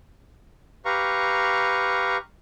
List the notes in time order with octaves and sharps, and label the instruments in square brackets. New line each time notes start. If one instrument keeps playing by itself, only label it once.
[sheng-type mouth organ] G4 B4 F5 A#5 C#6